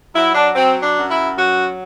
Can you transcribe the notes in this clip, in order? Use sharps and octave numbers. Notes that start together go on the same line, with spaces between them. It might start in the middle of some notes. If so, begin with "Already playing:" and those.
F#3 E4
D4
F#3 C4
D4
F#2
E4
F#3 F#4